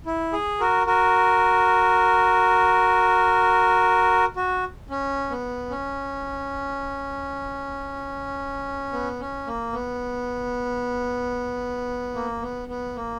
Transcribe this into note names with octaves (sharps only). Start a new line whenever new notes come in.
E4
G#4
F#4 A#4
F#4 A#4
F#4
C#4
B3
C#4
B3
C#4
A#3
B3
A#3
B3
B3
A#3